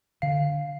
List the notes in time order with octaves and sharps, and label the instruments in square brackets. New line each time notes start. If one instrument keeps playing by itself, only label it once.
[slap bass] D3 [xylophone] F5